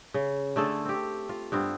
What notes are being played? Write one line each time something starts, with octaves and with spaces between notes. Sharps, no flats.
C#3
D3 A3 G#4 A4
C4 G4
F4
G2 B3 C4